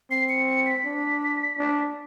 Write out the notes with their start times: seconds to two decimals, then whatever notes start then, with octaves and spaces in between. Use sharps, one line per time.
0.11 C4 C7
0.29 C#7
0.48 C#7
0.66 B6
0.85 D4
1.58 D4